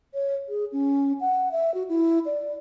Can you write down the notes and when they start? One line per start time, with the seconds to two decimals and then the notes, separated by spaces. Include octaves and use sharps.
0.14 C#5
0.49 G#4
0.72 C#4
1.21 F#5
1.52 E5
1.74 F#4
1.89 E4
2.26 D5